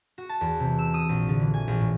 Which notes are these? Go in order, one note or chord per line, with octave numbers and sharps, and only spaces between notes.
F#4
A5
E2
C3
E6
D#6
A#1
D3
E3
G#5
A#1
A2